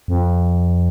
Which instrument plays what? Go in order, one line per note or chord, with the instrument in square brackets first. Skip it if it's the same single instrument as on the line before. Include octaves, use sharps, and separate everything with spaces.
[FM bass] F2